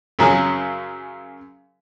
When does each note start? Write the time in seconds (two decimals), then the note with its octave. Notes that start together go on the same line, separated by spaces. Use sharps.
0.19 F#2 C#3 F#3 G#4